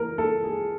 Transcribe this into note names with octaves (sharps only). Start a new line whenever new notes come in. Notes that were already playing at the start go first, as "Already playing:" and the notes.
Already playing: E3 A#4
A4
G#4